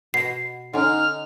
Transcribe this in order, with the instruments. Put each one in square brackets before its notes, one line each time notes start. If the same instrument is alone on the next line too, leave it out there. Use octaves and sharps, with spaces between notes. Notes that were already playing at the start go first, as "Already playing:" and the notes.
[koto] B2 [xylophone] C7
[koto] D3 C#4 [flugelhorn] D#4 [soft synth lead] F6